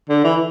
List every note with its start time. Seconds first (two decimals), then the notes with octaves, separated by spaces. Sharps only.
0.09 D3
0.24 E3